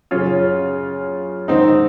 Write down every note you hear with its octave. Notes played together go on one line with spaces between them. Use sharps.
F#2 C#3 C#4 F4
G#2 D#3 C4 D#4